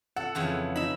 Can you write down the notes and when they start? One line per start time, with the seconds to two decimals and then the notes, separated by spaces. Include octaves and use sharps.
0.16 A4 F#5
0.35 F2 C#3 E3
0.76 D#4 E5 B5